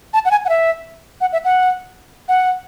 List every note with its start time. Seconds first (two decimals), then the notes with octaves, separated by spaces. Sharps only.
0.13 A5
0.25 F#5
0.31 G#5
0.45 F#5
0.49 E5
1.21 F#5
1.33 E5
1.45 F#5
2.28 F#5